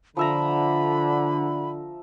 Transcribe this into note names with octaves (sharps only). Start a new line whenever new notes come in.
D3 F3 E5 A#5 B5